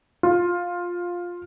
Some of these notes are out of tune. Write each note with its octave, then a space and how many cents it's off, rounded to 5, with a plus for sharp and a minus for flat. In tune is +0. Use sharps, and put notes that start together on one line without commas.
F4 +10